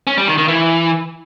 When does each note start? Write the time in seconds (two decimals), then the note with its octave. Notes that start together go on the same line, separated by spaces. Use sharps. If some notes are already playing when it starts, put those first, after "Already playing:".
0.07 C#4
0.17 G3
0.28 D#3
0.38 D#3
0.48 E3